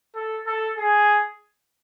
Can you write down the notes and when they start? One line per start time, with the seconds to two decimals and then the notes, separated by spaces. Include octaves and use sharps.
0.15 A4
0.47 A4
0.77 G#4